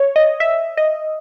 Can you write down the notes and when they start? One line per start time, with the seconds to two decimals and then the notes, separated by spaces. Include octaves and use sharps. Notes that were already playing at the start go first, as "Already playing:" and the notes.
Already playing: C#5
0.16 D#5
0.40 E5
0.77 D#5